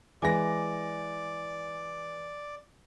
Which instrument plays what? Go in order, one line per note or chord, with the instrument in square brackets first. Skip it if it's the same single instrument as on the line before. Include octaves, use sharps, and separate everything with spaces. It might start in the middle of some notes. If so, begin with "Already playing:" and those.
[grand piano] E3 G#3 A#6 [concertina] D5 [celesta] E5 G#5 D6